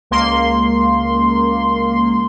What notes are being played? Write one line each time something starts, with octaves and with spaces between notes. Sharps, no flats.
C#2 A#3 C6